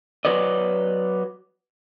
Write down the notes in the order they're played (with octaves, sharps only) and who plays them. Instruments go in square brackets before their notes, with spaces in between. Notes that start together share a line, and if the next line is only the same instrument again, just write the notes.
[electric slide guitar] F#3 B4 D5 D#5